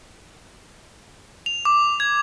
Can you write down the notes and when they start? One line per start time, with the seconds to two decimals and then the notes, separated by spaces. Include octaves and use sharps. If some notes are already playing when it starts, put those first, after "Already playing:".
1.46 F7
1.65 D6
2.00 G#6